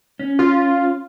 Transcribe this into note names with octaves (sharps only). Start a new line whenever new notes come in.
C#4
F4